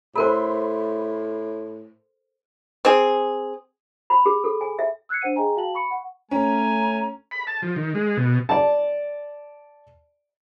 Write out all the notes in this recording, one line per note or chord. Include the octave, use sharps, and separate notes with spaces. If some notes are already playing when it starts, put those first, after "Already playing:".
A2 A4 A#4 C5 B5 C6
C4 G#4
B5
G#4
A4
G#5
E5
E6 F#6 G#6 C7 C#7
D4 C5 F#5 D#7
G#4 D#5 G5 G#5 A#5
F#4 F5 G5 A5 F#7
B5 C#6 C#7
F#5
A3 C#4 G#5 A#5
B5
A5
F3
D#3
G#3
B2
D5 A5